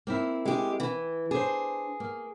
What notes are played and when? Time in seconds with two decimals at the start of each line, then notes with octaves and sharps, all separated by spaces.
0.07 A#3 C4 E4
0.45 G#3 G4
0.80 E3
1.31 D4 G#4 C5
2.00 A#3